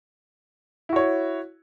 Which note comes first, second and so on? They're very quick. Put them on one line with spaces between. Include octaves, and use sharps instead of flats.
E4 F#4 C#5